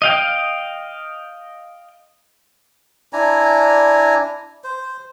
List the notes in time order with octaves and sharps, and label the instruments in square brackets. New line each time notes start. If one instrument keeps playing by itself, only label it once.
[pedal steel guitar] D#5 F5 G5
[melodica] D4 E4 G#5 A#5
C5